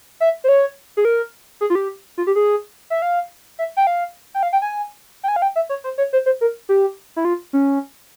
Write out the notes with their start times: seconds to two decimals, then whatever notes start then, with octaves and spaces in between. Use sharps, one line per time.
0.20 E5
0.44 C5
0.48 C#5
0.97 G#4
1.05 A#4
1.61 G#4
1.70 F4
1.75 G4
2.18 F4
2.27 G4
2.36 G#4
2.90 E5
3.02 F5
3.59 E5
3.77 G5
3.87 F5
4.34 G5
4.43 F5
4.53 G5
4.62 G#5
5.24 G5
5.28 G#5
5.36 F5
5.42 G5
5.56 E5
5.69 C#5
5.84 C5
5.98 C#5
6.13 C5
6.26 C5
6.41 A#4
6.69 G4
7.16 E4
7.25 F4
7.53 C#4